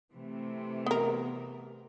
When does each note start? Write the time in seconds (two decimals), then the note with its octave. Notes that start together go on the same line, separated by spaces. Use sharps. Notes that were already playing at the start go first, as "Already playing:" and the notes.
0.12 C3 E3 A3
0.86 B3 A#4